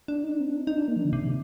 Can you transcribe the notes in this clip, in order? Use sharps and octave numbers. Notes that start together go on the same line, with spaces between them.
D4
D#4
D4
C4
D4
D#4
D#4
D4
A#3
F3
D3
C3